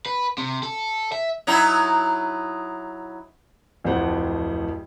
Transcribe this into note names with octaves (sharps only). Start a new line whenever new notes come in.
B4
C3
A4
E5
F#3 D#4 E4
D1 F2 A3 G4 C5 F#5